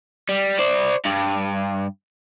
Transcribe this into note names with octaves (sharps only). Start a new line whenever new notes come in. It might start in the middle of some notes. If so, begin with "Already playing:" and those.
G3
C5 D5
G2